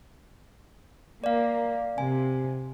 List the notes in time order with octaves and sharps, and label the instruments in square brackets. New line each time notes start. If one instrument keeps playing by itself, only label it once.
[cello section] A#3 [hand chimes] D5 F5
[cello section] C3 [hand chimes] G#5